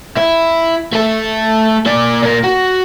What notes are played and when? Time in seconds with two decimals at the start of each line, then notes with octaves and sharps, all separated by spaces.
0.17 E4
0.93 A3 A4
1.86 A#3 D5
2.23 A#2 A#4
2.44 F#4